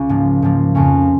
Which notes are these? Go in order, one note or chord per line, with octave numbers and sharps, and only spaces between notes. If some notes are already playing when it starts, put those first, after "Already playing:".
Already playing: C#2 C#3
G#2 F3 A#3
G#2 F3 A#3
F2 C#3 F3 A#3 C#4